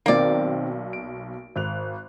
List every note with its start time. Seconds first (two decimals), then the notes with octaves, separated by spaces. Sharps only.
0.06 B1 D#3 A#3 C4 D5 F5
0.93 D7
1.56 G#1 F#6 F7